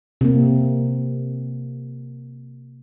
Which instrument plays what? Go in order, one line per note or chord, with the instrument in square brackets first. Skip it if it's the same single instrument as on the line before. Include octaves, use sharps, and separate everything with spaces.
[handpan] C3 A#3